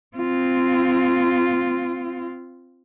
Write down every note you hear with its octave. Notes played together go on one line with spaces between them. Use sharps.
C4 F4